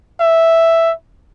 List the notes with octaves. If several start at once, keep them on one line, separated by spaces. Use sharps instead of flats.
E5